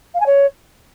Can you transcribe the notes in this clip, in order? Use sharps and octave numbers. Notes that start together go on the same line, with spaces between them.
F5
G#5
C#5